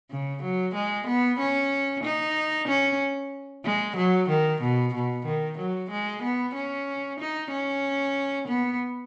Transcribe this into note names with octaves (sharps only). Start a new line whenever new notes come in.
C#3
F#3
G#3
B3
C#4
D#4
C#4
G#3
F#3
D#3
B2
B2
D#3
F#3
G#3
B3
C#4
D#4
C#4
B3